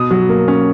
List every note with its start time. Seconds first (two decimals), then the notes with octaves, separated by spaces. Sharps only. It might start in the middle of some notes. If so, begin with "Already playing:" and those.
Already playing: B2 D#6
0.11 F#3
0.29 A#3
0.48 C#4